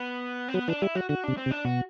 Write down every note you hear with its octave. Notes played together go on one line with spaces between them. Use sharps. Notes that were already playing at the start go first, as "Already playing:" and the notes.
Already playing: B3
C4
F#3 B3
E3 D4
G3 E4
F#3 F#4
D3 F#4
C3 D4
C4
C3
D4
B2 F#4